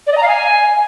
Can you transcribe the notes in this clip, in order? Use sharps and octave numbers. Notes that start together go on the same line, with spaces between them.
D5
D#5
A#5
F5
G#5